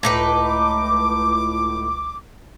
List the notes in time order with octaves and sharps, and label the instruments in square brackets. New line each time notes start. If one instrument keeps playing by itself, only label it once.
[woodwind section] C#2 D6 [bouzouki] A2 D#4 B4